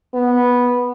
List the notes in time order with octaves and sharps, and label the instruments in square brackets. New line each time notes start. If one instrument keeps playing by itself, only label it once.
[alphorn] B3